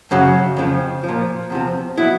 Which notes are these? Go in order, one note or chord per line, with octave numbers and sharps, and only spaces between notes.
F#2 C#3 F#3
F2 C#3 F3
F3
A#2
E2 C3 F3
B2 F#3 E4